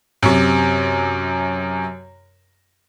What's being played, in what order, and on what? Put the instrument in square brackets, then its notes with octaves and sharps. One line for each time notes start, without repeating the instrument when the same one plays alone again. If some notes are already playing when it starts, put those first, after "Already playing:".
[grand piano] F#2 C3